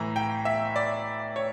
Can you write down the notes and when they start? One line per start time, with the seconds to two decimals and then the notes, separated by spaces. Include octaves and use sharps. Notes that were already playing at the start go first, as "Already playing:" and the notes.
Already playing: A2 E3 A#5
0.16 G5
0.45 E5
0.76 D5
1.36 C#5